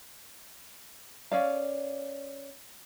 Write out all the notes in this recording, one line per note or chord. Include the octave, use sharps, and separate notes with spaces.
C#4 D5 F5